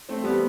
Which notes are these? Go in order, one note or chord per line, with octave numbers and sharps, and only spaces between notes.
A3 C4
G3 B3